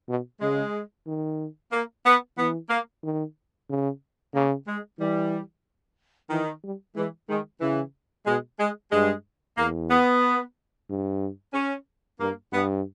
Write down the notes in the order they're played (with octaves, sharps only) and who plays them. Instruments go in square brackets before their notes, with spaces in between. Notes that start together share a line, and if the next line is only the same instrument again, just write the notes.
[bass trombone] B2
[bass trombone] C#3 [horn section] G#3
[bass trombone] D#3
[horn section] A#3
B3
[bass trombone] E3 [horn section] B3
[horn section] A#3
[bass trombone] D#3
C#3
[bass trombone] C#3 [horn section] A#3
[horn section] G#3
[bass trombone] E3 [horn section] G3
[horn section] D#3 [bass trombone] E3
[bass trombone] G3
[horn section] E3 [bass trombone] G#3
[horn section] D#3 [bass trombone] G#3
[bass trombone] C#3 [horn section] E3
[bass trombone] B2 [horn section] G#3
[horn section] G#3
[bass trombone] G2 [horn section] G#3
[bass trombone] E2 [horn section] A#3
[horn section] B3
[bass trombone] G2
[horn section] C#4
[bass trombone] G2 [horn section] A#3
[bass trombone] G2 [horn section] B3